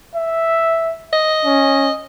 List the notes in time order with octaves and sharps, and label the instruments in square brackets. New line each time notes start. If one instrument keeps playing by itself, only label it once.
[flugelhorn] E5
[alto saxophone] D#5
[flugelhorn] C#4